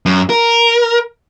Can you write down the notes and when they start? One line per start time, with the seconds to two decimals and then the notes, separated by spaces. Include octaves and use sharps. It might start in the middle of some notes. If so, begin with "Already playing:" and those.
0.06 F#2
0.30 A#4